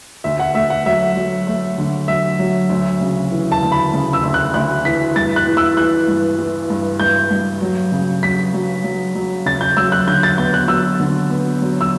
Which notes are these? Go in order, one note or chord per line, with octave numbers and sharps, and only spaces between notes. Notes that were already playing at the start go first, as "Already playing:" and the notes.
D2 E5
F#5
A3 E5
F#5
F#3 E5
F#3
A3
D3
F#3 E5
F#3
D2
C#3
E3
A5
D2
B5
C#3
E6
D2
F#6
D2 F#6
E3 B6
G2 A6
F#6
E3
E6
E3 F#6
G2
E3
G2
G2 G6
G2
F#3
C#3
F#3 B6
F#3
F#3
F#3
C#3 A6
G6
F#3 E6
F#6
D3 G6
A6
B3 G6
F#6
F#3 E6
D3
B3
F#3
E6